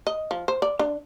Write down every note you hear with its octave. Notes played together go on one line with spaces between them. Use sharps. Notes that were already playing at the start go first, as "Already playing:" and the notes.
D#5
F3
C5
D5
D4